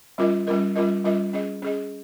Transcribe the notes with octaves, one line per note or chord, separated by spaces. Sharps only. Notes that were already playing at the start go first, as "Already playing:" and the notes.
G3 C#4 F4 A#4 D#5
G3 C#4 F4 A#4 D#5
G3 C#4 F4 A#4 D#5
G3 C#4 F4 A#4 D#5
C#4 G#4 D#5
C#4 G#4 D#5